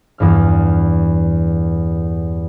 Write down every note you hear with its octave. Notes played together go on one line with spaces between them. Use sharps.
E2 G2 F6